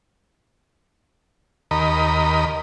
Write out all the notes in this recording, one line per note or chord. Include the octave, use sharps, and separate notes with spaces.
D#2 A#4 D#5 B5